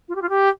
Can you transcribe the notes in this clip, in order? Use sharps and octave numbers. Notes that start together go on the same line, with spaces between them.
F4
G4
F4
G4